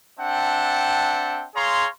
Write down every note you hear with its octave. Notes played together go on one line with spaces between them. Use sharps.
C4 D4 E5 F#5 G5 A5
G#4 C#5 F5 A#5 C6